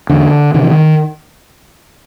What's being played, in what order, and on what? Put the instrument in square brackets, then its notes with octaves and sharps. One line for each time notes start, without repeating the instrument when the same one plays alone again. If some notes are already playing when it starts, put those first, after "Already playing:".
[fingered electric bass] E2 D3
C3 D#3
E3
D#3